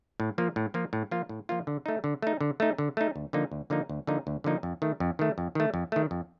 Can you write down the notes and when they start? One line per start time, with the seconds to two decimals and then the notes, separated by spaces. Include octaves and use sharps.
0.20 A2
0.38 F3 A#3 F4
0.56 A2
0.74 F3 A#3 F4
0.93 A2
1.11 F3 A#3 F4
1.29 A2
1.49 F3 A#3 F4
1.67 D3
1.86 A3 D#4
2.04 D3
2.22 A3 D#4
2.41 D3
2.60 A3 D#4
2.78 D3
2.97 A3 D#4
3.16 D2
3.33 D3 F3 A#3 D#4
3.52 D2
3.70 D3 F3 A#3 D#4
3.89 D2
4.07 D3 F3 A#3 D#4
4.27 D2
4.44 D3 F3 A#3 D#4
4.63 F2
4.82 D#3 A3
5.00 F2
5.19 D#3 A3
5.38 F2
5.55 D#3 A3
5.74 F2
5.92 D#3 A3
6.11 F2